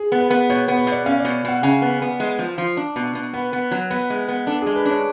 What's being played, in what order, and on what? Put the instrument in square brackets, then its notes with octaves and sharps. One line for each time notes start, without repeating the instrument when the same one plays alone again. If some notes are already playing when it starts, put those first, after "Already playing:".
Already playing: [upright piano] G#4
[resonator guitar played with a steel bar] B3
[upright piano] B4
[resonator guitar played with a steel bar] B3
[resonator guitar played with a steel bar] B2 [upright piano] C#5
[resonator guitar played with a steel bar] B3
[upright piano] B4
[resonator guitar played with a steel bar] B2 [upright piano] D5
[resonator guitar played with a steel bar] C#4 [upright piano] F5
[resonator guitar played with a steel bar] B2 [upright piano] D5
[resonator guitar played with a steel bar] B2 [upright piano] F#5
[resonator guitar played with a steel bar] C#3 [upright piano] G#5
[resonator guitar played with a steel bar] B3
B3
G#3
F3
F3
D4
B2
B2
[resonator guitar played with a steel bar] B3 [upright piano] B4
[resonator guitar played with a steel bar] B3
F#3
[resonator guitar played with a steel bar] B3 [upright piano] B4
[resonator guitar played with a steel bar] G#3
B3
[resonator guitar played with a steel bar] D4 [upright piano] A4
[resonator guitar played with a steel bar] G#3 [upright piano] G#4
[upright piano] B4
[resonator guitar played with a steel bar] D4 [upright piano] C#5